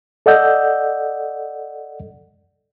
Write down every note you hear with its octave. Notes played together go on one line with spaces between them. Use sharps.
A4 D5 D#5 F#5 E6 G6